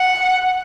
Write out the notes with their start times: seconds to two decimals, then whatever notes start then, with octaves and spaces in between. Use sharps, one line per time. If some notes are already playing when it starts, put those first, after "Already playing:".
Already playing: F#5